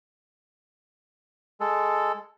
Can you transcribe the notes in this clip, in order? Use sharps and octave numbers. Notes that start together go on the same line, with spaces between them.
G#3 A4